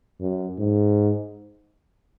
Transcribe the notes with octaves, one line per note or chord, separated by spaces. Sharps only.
F#2
G#2